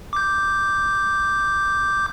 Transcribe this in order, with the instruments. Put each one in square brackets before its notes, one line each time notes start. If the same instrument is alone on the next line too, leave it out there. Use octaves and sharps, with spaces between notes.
[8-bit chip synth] D6 G6